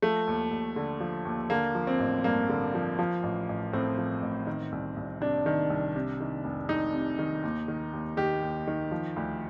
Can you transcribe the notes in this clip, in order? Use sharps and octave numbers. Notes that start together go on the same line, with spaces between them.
F3 A3
D#2
D#2
D3
F3
D#2
D3 A#3
F3
C4
A1
G2 A#3
D3
F3
F3
A1
A1
A2 C4
F3
A1
D#3
C2
C2
C3 D4
D#3
C2
C3
D#3
F1
F2 D#4
C3
D#3
D#2
D#3
D#2
D#3 G4
D#2
D#3
F3
D2